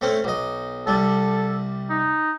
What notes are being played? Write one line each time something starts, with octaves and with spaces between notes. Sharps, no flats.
A3 C4 C#4
B1 D#5
C2 G3 A4
D#4